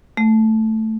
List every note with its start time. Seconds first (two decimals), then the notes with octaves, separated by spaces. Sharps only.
0.17 A3